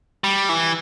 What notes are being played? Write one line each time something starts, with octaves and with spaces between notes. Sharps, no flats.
G3
E3